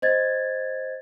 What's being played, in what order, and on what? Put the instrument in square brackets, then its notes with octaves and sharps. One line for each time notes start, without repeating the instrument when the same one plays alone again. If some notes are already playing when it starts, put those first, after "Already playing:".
[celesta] C5 D#5 G#6 A6